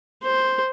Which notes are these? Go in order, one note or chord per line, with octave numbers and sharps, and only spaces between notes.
C5